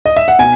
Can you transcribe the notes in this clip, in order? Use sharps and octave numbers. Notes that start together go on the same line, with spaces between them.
D#5
E5
F#5
B2 G#5